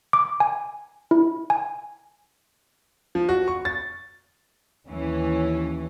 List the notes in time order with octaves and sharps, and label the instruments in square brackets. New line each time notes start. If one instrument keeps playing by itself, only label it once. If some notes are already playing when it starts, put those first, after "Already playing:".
[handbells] D6
G#5
E4
G#5
[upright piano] F3
F#4
C#6
A6
[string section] D#2 E3 C#4